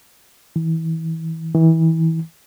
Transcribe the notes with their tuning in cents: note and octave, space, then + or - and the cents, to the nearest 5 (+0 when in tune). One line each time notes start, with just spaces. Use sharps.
E3 -25
E3 -25